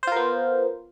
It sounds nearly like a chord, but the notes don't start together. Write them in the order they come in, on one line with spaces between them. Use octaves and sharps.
C5 F4 A#4 B3